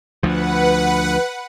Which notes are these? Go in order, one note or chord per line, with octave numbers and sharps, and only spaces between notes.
D2 F3 B4 F#5